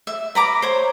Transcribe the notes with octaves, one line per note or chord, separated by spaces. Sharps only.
E5
B4 A#5 D6
C5 C#5